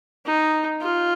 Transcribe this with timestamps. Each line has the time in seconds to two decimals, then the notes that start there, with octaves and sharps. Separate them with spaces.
0.26 D#4
0.81 F4